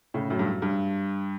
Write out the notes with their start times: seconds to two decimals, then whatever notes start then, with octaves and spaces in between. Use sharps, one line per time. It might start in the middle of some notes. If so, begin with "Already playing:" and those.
0.14 A2 C#3
0.30 F#2 A2
0.39 G2
0.46 F#2
0.62 G2